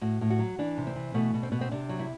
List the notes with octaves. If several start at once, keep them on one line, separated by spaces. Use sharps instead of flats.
A2 F#4
A2
F#4
F#3
E3 D4
C3
C4
E3
B2 A3
B2
C4
B2 B3
C4
C3 D4
F#3
E4